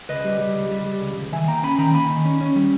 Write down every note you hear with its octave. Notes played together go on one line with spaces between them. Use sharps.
C#2 B4 D#5
G3
G3
C#2
G3
G3
C#2
C#2
D#3 E5 G#5
A#3 G5 A#5
C#4 G#5 B5
D#3 G5 A#5
A#3 G#5 B5
D#3
C#4
C#4
G3